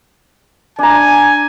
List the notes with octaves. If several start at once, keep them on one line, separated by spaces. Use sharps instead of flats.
D4 G#5 A#5